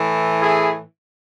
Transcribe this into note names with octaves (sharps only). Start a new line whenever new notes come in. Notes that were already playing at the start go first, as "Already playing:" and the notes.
Already playing: A2 E3
E4 G#4